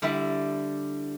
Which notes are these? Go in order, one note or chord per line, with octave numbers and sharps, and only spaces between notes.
D3 G3 E4 E5 B5